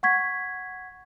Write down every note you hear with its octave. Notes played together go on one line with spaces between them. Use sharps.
F#5 C#6 G#6 B6